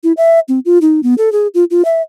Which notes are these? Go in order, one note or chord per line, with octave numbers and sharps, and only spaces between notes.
E4
E5
C4
F4
D#4
B3
A4
G#4
F4
F4
E5